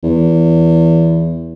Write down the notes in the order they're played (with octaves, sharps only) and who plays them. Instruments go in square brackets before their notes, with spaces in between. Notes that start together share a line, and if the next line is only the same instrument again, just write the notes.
[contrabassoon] E2